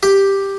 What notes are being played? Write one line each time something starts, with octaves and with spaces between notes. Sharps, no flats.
G4